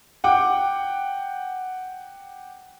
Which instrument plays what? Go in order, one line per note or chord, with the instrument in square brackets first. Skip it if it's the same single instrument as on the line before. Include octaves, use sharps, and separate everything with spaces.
[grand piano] F#5 G5 D6